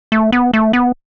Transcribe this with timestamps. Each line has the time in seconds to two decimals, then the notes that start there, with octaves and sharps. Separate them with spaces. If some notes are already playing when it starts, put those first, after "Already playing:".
0.12 A3
0.32 B3
0.53 A3
0.73 B3